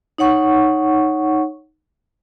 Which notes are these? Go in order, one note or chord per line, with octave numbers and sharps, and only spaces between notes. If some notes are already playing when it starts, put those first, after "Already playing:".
D#4 C#5 F#5 C#6